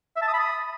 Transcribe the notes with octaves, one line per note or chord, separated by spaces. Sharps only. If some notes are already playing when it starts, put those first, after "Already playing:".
E5
A5
D#6
B5
D#6